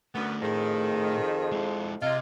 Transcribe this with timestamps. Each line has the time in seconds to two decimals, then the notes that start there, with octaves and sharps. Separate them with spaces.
0.15 F#2 A3 B3 D4
0.42 F2 A2 D#3 A3 G#4
1.52 G#3 E4
2.02 C3 G#3 F4 D#5